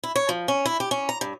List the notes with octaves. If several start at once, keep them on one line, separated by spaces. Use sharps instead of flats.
E4
C#5
F3
C#4
E4
G4
C#4
A#5
G2